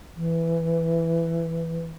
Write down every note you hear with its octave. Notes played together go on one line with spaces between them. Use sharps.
E3